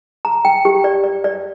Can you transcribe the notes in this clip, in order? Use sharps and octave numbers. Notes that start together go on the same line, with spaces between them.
A#5
G5
G4
D5
D5
D5